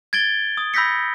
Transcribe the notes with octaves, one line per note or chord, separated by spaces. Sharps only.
G#6 A6 D7 G7
D#6
B5 E6 G6 A#6 B6 C#7